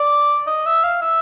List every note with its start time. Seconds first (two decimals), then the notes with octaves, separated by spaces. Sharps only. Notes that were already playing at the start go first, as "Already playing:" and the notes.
Already playing: D5
0.47 D#5
0.66 E5
0.84 F5
1.02 E5